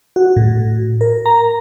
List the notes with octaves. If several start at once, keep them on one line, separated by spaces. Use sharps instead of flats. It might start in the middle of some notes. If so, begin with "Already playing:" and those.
F#4
A2
A#4
A#5